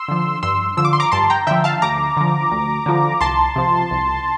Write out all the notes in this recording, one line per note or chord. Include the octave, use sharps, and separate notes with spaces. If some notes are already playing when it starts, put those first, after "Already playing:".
Already playing: C6 E6
D3 F3
G2 C6 E6
D3 F3 E6
D6
C6
A#5 D6
G2 A5 C6
G5 A#5
D3 F3 E5 G5
F5 A5
D2 A#5 D6
D3 F3
D2
D3 F3
C2 A5 C6
C3 F3
C2